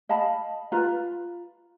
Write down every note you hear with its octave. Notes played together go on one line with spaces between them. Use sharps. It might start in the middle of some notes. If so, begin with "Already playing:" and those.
D#5 F5 A5 B5
F4 B4 A#5